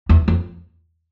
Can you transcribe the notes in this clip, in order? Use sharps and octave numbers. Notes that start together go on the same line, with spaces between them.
E2
F2